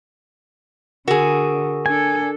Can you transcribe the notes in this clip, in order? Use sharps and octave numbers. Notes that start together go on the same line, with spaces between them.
D3 F#4 G#4 A#4
D4 A4 G#5